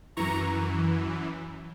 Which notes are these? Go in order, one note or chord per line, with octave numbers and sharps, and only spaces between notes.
F#2 E3 A#5 C#6